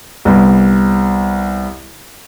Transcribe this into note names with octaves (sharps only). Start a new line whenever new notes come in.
C2 B3